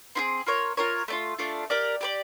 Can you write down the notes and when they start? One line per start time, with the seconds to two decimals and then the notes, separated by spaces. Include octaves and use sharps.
0.15 C4 E4 G#4
0.46 F4 A#4 C#5
0.77 F4 A#4 C#5
1.08 A3 D4 F4
1.38 A3 D4 F4
1.70 G4 A#4 D5
2.01 G4 A#4 D5